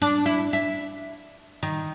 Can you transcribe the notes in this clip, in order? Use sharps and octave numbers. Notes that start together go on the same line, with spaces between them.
D4
E4
E5
D#3